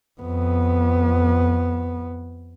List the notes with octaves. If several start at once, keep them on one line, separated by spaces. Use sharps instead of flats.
F2 B3